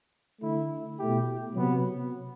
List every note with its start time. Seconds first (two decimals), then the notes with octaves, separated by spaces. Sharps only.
0.41 D3 A3 E4
0.98 B2 A3 E4 G4
1.54 C3 F#3 B3